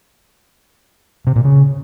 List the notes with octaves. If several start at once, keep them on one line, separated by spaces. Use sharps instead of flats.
C3
A#2
C#3